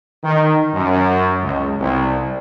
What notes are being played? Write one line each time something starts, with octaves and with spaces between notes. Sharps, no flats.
D#3
F#2
C#2
C2